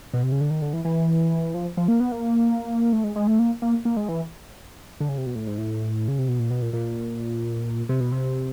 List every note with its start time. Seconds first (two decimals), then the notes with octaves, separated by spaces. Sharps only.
0.14 B2
0.23 C3
0.32 C#3
0.41 D3
0.50 D#3
0.62 D3
0.73 E3
0.85 E3
1.54 F3
1.77 F3
1.88 A#3
2.00 B3
2.12 A#3
2.93 A3
3.04 G#3
3.16 G#3
3.27 A3
3.39 A#3
3.62 A#3
3.85 A#3
3.97 G#3
4.09 E3
5.00 D3
5.09 C#3
5.18 C3
5.26 B2
5.35 A2
5.47 G#2
5.58 A2
6.08 C#3
6.18 C3
6.28 B2
6.39 A#2
6.50 B2
6.62 A#2
6.73 A#2
7.89 C3
8.01 B2
8.12 C3